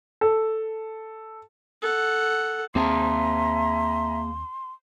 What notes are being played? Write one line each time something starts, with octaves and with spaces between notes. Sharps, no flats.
A4
A4 F#5
D#2 A#3 C4 G#4 E5 G#5 A#5 C6